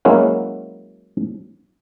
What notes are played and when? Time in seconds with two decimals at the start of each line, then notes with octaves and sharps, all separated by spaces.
0.05 F#3 G#3 A#3 C#4 E4 F#4